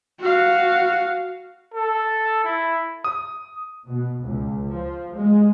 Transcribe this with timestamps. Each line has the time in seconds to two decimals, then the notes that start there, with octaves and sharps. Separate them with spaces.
0.20 F#4 F5
1.74 A4
2.44 E4
3.04 D#6
3.87 B2
4.21 C#2
4.71 F3
5.16 G#3